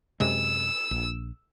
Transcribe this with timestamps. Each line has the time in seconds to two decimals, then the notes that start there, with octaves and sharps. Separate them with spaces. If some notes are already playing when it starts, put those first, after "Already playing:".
0.20 F#2 C3 G#3 E6
0.91 A#1